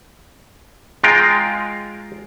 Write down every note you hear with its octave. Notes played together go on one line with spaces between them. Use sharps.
G#3 F4 G5 A#5